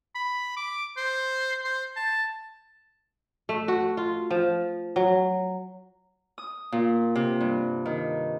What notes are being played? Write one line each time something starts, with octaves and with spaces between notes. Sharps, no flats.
B5
D6
C5
C5
A5
A3
F#4
F4
F3
F#3
D#6
A#2
C3
G2
D#3